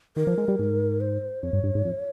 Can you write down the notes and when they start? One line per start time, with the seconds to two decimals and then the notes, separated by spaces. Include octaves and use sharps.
0.16 D#3 A#4
0.27 F3
0.38 G#3
0.48 G3
0.59 G#2
1.01 C5
1.43 F2 C#5
1.53 G2
1.63 G2
1.75 G#2
1.85 F2